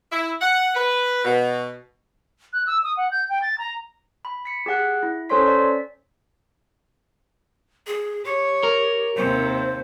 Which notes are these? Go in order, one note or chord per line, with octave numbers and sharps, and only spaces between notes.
E4
F#5
B4
B2
F#6
E6
D#6
F#5
G6
G5
A6
A#5
B5
B6 C#7
G4 G#4 F#5 F#6
E4
C#4 A4 C5 C#5 C6 B6
D5 B6
G#4
G4 C#5
A#4
D#2 C3 C5